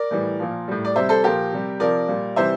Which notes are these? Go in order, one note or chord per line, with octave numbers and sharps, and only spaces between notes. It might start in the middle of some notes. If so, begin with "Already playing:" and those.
Already playing: A#4 D5
A2 E3 G3
A#2 F3
A2 G3
D5
C3 G3 C5 E5
A4 C5
A#2 F3 G4 A#4
C3 G3
C3 F3 A#4 D5
A#2 G3
C3 E3 G3 C5 E5